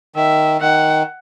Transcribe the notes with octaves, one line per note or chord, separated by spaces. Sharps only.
D#3 E5
D#3 F#5